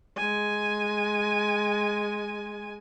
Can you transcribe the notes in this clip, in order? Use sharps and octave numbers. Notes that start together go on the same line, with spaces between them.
G#3 G#5